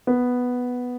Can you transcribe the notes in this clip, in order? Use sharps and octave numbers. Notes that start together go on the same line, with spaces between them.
B3